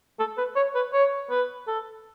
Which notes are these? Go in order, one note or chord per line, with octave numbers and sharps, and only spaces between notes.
A4
B4
C#5
B4
C#5
B4
A4